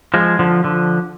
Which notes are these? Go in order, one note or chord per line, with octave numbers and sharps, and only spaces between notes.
F3 G#3
D3 F3
D3 F3